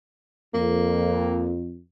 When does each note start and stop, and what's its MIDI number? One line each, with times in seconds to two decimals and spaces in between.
0.54 1.78 41
0.54 1.54 58